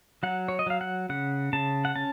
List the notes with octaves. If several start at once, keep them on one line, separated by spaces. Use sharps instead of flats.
F#3 F#5
C#5
D#5
F#3 F5
F#5
C#3 F#5
C#3 A5
F#5
C#4 A5